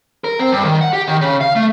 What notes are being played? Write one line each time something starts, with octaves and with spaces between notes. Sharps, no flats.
A#4
C4
G2
D#3
F#5
G4
D#3
C#3
F5
A3